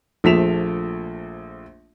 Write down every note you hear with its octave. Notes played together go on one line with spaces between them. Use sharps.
A#1 F3 A3 B6 E7 F7